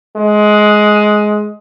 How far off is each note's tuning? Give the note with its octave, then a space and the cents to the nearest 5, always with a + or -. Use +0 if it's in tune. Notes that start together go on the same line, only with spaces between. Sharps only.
G#3 +15